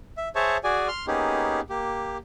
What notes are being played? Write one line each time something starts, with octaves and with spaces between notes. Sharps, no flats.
E5
G#4 C5 C#5 E5 A5 C#6
F#4 G#4 D5 G#5
C6 F6
A#3 B3 C#4 D#4 G4 G#4
A#3 G4